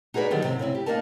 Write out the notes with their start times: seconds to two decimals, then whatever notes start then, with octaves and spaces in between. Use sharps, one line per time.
0.14 D#4 F#4 G#4 A#4 B4 D5
0.31 D3 D#3 F#3 G3 G4
0.44 C3 C4
0.59 C#3 C4 E4
0.75 G4
0.86 A#3 D4 D#4 A#4 A5